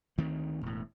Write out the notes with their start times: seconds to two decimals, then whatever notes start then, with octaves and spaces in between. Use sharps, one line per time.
0.18 D2 D#3 A3 C4
0.62 E1 A2